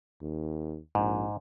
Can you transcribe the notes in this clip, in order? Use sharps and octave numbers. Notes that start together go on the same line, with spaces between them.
D#2
A#1 G#2